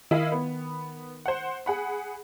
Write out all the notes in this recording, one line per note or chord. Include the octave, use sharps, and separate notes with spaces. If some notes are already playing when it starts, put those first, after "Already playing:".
D#3 E4 D#5 F5
B3
C5 F#5
G#4 F#5 B5